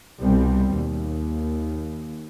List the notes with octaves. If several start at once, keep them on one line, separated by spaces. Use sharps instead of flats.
C2 B2 G3 C4
D#2